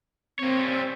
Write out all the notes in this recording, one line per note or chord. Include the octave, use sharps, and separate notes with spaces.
A#3 C4 C#5
G3 C#4